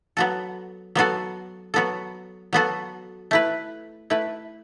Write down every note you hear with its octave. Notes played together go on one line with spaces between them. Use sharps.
F#3 B3 F#4 A4
F#3 B3 F#4 A4
F#3 B3 F#4 A4
F#3 B3 F#4 A4
A3 E4 B4
A3 E4 B4